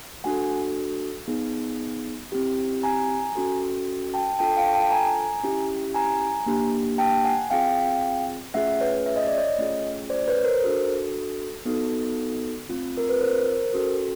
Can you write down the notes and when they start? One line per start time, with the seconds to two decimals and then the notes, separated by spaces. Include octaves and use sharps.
0.24 A3 D4 F#4 A4 F#5 G#5
1.28 B3 D#4 G#4
2.32 C4 E4 G4
2.83 G#5 A#5
3.35 C#4 F#4 A4
4.14 G5 A5
4.39 D4 F4 A4 G5 A5
4.57 F5 G5
4.74 G5 A5
4.91 G#5 A#5
5.43 C#4 E4 G4
5.95 G#5 A#5
6.46 A#3 D4 G4
6.98 G5 A5
7.24 F#5 G#5
7.50 C4 F4 G#4 F5 G5
8.54 A3 C#4 F4 G#4 E5 F#5
8.80 B4 C#5
9.06 E5
9.16 D#5
9.27 D5
9.38 C#5 D#5
9.58 A3 C#4 F4 G#4
10.10 C5 D5
10.28 B4 C#5
10.44 A#4 C5
10.62 D4 F#4 A4
11.65 B3 D#4 F#4 A4
12.69 A3 C4 F4
12.97 A#4
13.09 B4
13.21 A#4 C5
13.73 C#4 F#4 A4